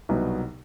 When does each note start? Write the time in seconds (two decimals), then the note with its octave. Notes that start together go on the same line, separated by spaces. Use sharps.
0.09 C2 B2 F#3 B3 D#4